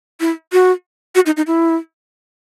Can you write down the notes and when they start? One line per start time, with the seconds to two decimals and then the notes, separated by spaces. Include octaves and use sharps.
0.20 E4
0.52 F#4
1.15 F#4
1.26 D#4
1.37 D#4
1.47 E4